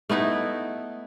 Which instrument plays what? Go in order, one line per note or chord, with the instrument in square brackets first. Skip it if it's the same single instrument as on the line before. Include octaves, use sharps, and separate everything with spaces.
[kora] A3 B3 D#4 E4